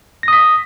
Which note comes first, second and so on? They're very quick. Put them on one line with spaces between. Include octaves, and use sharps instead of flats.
A#6 D#6 B6